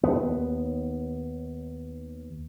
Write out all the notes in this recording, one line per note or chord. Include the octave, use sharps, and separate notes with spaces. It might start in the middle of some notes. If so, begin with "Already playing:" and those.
D#2 B3